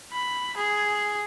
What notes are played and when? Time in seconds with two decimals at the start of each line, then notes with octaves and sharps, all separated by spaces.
0.13 B5
0.57 G#4